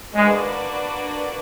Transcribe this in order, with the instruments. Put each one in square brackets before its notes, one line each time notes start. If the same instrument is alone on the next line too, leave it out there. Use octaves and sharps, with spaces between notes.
[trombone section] G#3 [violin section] A#3 D4 F#4 B4 D5